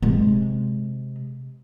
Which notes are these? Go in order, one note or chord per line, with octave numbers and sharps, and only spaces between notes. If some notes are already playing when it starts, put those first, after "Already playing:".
C3 G#3